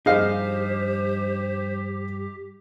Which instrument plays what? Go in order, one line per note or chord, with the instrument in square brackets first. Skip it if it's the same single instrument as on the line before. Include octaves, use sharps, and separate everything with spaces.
[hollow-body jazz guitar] G2 F3 D#4 [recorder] G4 [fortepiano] G#4 D#5 F5 [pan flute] C5